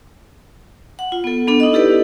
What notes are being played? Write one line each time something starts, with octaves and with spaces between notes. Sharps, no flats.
F#5
F4
B3 A4
B3 D4 A4
D#4 D#5
E4 G4 A4 B4 D5